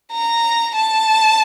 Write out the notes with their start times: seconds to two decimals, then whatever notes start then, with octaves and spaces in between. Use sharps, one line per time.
0.13 A#5
0.76 A5